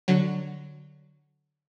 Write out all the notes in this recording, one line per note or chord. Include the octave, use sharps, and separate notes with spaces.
D3 F#3